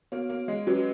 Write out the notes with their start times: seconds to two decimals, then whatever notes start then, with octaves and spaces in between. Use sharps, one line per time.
0.12 A#3 B3 F#4 C#5
0.30 A#3
0.48 G#3
0.67 F#3 C#4 F#4 B4